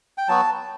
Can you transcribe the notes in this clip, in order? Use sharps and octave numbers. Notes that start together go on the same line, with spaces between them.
G5
F#3 B3 F#4 A5